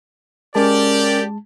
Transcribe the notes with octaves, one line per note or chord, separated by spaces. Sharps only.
G#3 C#4 G4 A#4 D5 A5